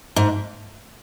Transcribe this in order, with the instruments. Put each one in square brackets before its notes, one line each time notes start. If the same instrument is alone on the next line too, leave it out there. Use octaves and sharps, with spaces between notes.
[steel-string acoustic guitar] G#2